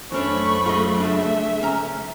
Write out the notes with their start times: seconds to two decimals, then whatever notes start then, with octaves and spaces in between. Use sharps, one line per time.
0.12 F#2 E3 A3 C#4 D4 C5 B5 C#6
0.66 F4 G#4 D#5
1.00 C#2 D4 E5
1.61 C#2 C#4 A#5